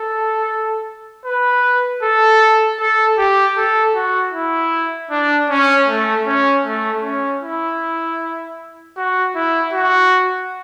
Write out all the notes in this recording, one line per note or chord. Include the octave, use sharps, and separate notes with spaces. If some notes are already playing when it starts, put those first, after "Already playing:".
Already playing: A4
B4
A4
A4
G4
A4
F#4
E4
D4
C#4
A3
C#4
A3
C#4
E4
F#4
E4
F#4